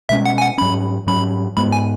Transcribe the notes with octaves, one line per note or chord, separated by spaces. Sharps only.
B2 G#3 C#4 E5
F#5
G#5
F#5
G#2 F#3 C#4 B5
G#2 F#3 C#4 B5
G#2 G#3 B3 B5
G#5